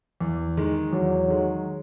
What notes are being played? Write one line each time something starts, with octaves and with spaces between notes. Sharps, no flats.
E2
D#3 G#3
E2 F#3
D#3 G#3